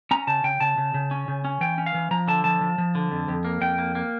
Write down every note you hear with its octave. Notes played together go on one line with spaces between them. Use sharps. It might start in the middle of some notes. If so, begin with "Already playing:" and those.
C#4 A#5
C#3 A5
C#3 G5
C#3 A5
C#3
C#3
C#4
C#3
C#4
E3 G5
C#4
F5
E3
F3 A#5
D3 A5
F3 A5
F3
F3
D3
F2
F2
A#3
F2 G5
A#3
A#3